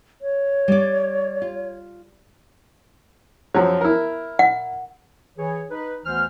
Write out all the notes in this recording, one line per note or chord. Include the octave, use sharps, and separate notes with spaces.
C#5
G3 D5
F4
F#2 F3 F#3
E4 A#4
F#5
E3 G#4 C#5
D#4 B4
D2 E3 B3 B4 C5 F6